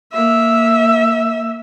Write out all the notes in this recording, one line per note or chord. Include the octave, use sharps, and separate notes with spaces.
A#3 E5